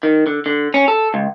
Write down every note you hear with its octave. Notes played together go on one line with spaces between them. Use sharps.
D#3
D3
D3
C#4
A4
C#2